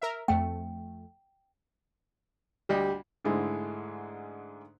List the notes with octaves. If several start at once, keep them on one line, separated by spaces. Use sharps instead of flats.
A#4 E5
F2 A3 G5
D2 G3 G4 D#5
G#2 D3 G#3 A3 E4